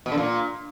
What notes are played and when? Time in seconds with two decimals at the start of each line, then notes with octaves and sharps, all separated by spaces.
0.06 B2
0.12 D3
0.18 A#2